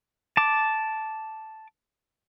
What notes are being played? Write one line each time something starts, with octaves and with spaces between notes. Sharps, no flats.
A5 D6